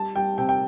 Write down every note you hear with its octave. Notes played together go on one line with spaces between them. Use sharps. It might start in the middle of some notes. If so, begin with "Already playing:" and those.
Already playing: G3 A5
G3 G5
C3 G5
G5